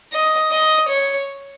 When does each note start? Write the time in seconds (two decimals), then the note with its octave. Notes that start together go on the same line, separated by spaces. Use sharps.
0.13 D#5
0.52 D#5
0.89 C#5